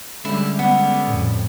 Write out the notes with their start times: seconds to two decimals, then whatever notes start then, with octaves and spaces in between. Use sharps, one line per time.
0.25 D3 G3 G#3 C#4 E4
0.59 B3
1.07 F2 A2